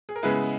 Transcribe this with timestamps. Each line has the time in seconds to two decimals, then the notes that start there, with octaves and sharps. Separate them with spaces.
0.09 G#4
0.16 A#4
0.22 C#3 G#3 B3 E4 G#4 B4